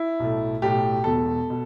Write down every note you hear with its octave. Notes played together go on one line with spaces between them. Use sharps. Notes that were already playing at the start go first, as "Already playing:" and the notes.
Already playing: E4
B1 A2 A3
B1 A2 A3 G4
E1 E2 B2 A4
B2